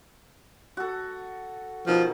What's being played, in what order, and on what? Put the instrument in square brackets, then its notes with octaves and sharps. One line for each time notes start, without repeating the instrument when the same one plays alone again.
[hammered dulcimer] F#4 A4
[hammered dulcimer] B2 D#3 D#4 [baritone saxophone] F3